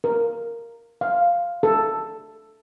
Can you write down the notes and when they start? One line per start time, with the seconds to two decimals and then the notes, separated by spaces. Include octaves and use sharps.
0.04 A#4
1.01 F5
1.63 A4